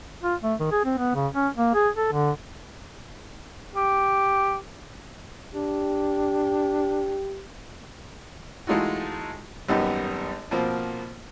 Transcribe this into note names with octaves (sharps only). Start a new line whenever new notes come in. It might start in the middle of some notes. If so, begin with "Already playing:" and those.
F4
A3
D#3
G#4
C4
B3
C#3
C#4
A#3
G#4
A4
D3
G4
D4 G4
E3 G#3 A3 D#4 F4 F#4
G#1 F#2 G3 B3 D#4 G4
B2 F3 A#3 C4